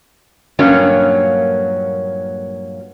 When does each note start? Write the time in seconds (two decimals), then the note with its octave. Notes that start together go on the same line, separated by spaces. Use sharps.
0.59 G2 A#2 F#3 A#3 C#4